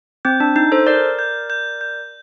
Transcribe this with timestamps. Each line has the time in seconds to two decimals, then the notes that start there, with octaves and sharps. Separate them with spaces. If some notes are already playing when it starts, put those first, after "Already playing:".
0.25 C4 G6
0.40 D4
0.56 D#4 G6
0.72 A4 C5
0.86 A#4 D5 G6
1.19 G6
1.50 G6
1.81 G6